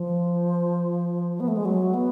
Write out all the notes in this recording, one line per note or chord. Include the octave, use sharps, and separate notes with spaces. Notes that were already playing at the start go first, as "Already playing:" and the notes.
Already playing: F3
B3
A3
G#3
F#3
B3